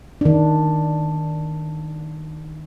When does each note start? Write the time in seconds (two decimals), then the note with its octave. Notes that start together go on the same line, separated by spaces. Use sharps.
0.21 D#3 D4